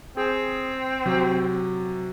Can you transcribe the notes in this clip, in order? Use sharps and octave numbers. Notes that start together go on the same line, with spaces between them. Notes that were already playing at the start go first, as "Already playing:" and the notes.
C4 G#4 G#5
C3 F#3